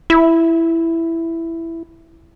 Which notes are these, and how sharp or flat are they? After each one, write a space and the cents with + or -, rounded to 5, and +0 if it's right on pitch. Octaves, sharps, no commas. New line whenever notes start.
E4 +5